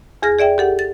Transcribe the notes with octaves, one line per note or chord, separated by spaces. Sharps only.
E2 G#4 F6 A#6
G#4 D5 E5 G5
G4 A4 F#5
A6